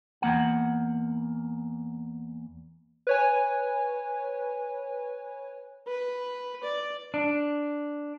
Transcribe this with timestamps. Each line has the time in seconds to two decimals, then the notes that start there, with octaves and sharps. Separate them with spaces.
0.22 E2 A#3 F#5
3.07 B4 C#5 G#5
5.87 B4
6.64 D5
7.14 D4